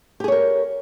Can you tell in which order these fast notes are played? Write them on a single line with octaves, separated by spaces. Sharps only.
G4 G#4 C#5 A#4